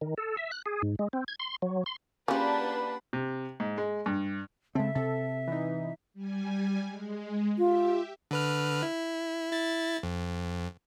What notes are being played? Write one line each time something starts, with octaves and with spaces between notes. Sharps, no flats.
D#3
A4
E5
F#6
G#4
G#2
G#3
C4
G#6
C6
F#3
C6
C#3 A#3 D4 F4 G4 B4 F#5 B5
C3
G#2
G#3
G2
C#3 G#3 C4 A4 E5
C3 A4
E3 D#4
G3 G#5
G#3
F4 G4 E5
D3 B4 F6
E4
E4 A6
F2